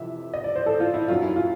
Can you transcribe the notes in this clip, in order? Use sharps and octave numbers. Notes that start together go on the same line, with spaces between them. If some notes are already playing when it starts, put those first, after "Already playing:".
Already playing: F2 C3 E3 E5
D#5
D5
C5
A4
F4
E4
F#2 D#3 F#3 F4
E4
F4